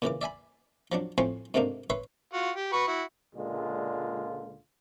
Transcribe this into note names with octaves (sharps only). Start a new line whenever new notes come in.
A#2 C#3 E3 D6
D5 E5 G#5 B5
F3 F#3 D4
A2 F3 C4 G#5 C6 C#6
G#2 C3 A3 A#3 D4 D#4
B4 C#5 E5 B5 C6
F4 F#4
G4
F#4 B4 C#6
E4 F#4
C#2 A#2 D3 G#3 F4